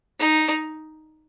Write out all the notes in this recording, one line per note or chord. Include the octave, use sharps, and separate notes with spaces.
D#4